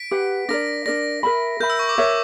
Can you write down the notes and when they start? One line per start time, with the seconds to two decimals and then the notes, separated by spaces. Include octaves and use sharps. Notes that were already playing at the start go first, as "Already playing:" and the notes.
Already playing: B6 D7
0.11 G4 B4 F#5
0.48 D4 A#4 D5 A#6
0.86 D4 A#4 D5 A#6
1.23 A#4 E5 B5
1.60 A#4 E5 B5 G6
1.70 E6
1.79 C#6
1.89 D6
1.98 A#4 C#5 E5